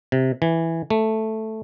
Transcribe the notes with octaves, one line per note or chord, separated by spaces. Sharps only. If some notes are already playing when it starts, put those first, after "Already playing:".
C3
E3
A3